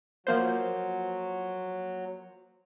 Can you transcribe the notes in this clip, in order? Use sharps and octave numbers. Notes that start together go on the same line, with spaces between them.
F3 F#3 A#3 C5